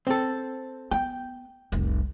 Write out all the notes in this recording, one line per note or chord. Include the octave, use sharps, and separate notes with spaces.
C4 A4
B3 G5
F1 C2